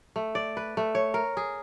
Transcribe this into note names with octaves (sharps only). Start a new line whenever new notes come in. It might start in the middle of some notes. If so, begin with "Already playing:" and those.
A3
D5
B4
A3
C#5
A#4
G#4